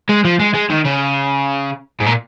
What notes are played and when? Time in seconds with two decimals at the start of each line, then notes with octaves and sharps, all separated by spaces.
0.09 G#3
0.25 F3
0.40 G#3
0.54 G#3
0.70 D#3
0.85 C#3
2.00 G#2
2.06 A#2